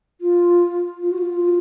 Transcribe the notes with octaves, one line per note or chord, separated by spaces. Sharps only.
F4
F4
F#4
F4